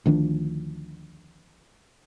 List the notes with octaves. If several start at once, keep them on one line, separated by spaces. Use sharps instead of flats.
D2 D#3 F3 D4